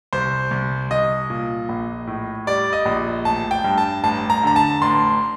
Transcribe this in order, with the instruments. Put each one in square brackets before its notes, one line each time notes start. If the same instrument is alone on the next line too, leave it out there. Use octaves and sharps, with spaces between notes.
[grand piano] C2 C5
C2
C2 D#5
A#2
A#1
A2
G3 D5
D#5
A#1
A1 A5
G5
G2
A5
A1 A5
A#5
D3 A#5
A5
A1 C6